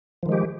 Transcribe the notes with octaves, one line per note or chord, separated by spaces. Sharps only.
D#3 F3 G#3 G4